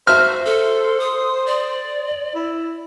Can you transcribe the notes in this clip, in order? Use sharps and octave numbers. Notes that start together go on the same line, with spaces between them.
F#4 C5 E5 F6
A4
D#6
D5
E4